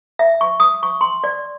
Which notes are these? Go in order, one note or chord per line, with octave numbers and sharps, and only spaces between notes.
E5
C#6
D#6
C#6
C6
D5